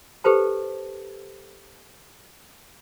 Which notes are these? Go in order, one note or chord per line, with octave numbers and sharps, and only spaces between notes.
G4 A4 B4 C5 A5